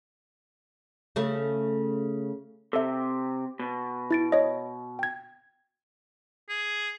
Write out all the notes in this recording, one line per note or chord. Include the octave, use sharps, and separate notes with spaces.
C#3 A3
C3 A4 E5
B2
E4 A6 D7
C#5 D#5
G5 G#6
G#4